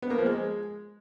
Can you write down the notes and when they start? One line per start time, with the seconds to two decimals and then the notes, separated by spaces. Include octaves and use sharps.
0.02 B3
0.10 A#3
0.18 F3
0.26 G#3